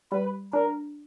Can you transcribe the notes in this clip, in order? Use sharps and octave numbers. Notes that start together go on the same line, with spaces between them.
G3 B4
D4 A#4